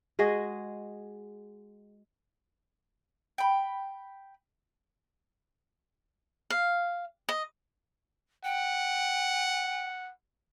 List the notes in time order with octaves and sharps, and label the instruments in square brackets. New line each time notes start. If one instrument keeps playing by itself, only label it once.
[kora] G#3 F#4 G#4 D#5
[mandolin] G5 B5
[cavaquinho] F5
D#5
[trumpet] F#5 [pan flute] G5